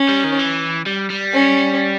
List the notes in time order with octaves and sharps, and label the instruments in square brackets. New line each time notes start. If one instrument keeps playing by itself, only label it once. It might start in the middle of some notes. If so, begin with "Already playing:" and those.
Already playing: [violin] C#4
[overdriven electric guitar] G3
D#3
E3
G3
G3
[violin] C#4